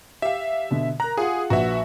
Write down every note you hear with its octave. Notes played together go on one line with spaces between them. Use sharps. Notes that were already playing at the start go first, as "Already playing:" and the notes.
G4 E5 F5
B2 D3
A#4 A#5 F#6
F4 G4 G#4 F#5
A#1 F#4 B4 E5 F#5